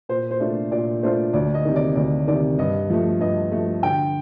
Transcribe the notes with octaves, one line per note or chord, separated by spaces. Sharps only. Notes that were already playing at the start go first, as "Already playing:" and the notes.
A#2 C5
C5
A3 D4 F4
A#2 D5
A3 D4 F4 C5
D2 D5
D#5
C3 D#3
D5
D2 D5
C3 D#3 D5
G2 D#5
F3 A3
G2 D#5
F3 A3
D3 G5